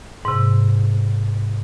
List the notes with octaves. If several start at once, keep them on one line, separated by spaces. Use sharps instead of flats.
G#2 C3